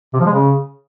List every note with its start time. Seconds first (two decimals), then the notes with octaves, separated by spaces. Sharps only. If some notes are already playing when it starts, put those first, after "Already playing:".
0.13 C3
0.20 F3
0.26 G#3
0.32 C#3